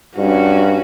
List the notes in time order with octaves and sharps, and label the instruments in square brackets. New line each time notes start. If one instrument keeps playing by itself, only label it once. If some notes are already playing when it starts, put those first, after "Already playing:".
[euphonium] G2 [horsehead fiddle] C#4 F#4